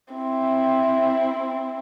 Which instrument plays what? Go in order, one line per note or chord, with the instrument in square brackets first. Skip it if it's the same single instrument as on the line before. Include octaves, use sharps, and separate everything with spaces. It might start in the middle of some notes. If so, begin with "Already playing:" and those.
[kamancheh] C4 E4